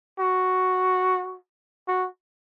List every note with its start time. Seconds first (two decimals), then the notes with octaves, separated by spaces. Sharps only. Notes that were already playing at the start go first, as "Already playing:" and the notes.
0.19 F#4
1.88 F#4